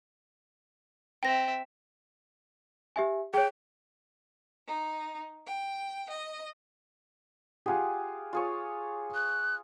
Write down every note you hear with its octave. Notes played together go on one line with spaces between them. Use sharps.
C4 E5 G5 A#6
G4 E5 G#5
G#4 C#5 G5
D#4
G5
D#5
F4 G4 G#4 F#5 G#5
F4 G#4 C#5
F#6